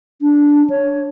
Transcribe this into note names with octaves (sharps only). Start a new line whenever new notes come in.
D4
C#5